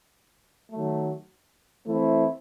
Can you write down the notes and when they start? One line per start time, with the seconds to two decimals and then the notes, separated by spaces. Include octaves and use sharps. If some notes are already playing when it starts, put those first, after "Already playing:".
0.71 D#3 F#3 A3
1.85 E3 A3 C4 E4